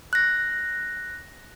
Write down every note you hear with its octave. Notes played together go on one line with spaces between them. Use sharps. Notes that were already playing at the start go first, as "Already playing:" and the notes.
F#6 A#6